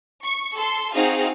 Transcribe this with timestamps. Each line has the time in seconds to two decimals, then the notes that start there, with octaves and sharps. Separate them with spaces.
0.23 C#6
0.55 A4 C6
0.94 C4 D#4 F#4 G#4 F5